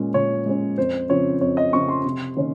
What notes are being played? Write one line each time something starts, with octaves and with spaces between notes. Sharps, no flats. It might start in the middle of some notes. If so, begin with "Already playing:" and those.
Already playing: A#2 G#3 C#4
A#2 C#5
G#3 C#4
F2 C5
C#3 F3 C4 C#5
F2 C#5
D#5
C#3 F3 C4 C#6
C6
C3
D#3 A#3 C#4